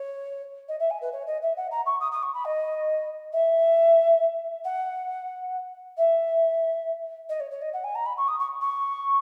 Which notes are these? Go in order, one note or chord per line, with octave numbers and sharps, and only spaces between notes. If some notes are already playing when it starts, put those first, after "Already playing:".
Already playing: C#5
D#5
E5
G#5
B4
C#5
D#5
E5
F#5
A#5
C#6
D#6
D#6
C#6
B5
D#5
E5
F#5
E5
D#5
C#5
C#5
D#5
F#5
G#5
A#5
B5
C#6
D#6
C#6
C#6